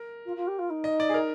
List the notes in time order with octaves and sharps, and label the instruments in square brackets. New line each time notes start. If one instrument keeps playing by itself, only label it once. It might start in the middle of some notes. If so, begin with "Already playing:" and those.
Already playing: [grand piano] A#4
[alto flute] F4
F4
G4
F4
D#4
[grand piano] D#5
D5
G#4
A#4